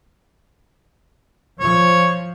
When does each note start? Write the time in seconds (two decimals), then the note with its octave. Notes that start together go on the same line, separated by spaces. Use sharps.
1.60 F3 C#5